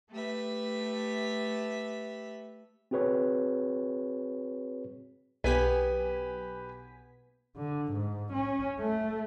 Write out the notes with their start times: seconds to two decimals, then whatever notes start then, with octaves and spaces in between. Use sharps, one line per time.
0.12 A3 G4 B4 E5
2.91 C4 F#4 G#4 B4 C#5
5.44 B1 B3 G4 B4 G#5 B6
7.57 D3
7.93 G#2
8.33 C#4
8.80 A3